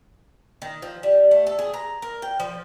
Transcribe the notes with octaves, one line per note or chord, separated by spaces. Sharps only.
D#3
F3
G3
A3
A4
G#4
A#5
A#4
G5
F3